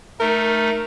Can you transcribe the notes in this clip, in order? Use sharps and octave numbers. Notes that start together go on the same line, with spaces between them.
A3 D#4 A#4